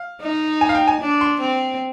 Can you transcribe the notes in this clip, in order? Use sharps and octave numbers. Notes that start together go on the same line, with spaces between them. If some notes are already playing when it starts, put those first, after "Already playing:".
Already playing: F5
D#4
G#5
F5
G5
G#5
D4
C6
C4